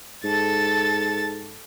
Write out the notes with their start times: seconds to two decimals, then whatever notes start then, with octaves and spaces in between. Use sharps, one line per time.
0.24 G#2 A4 A6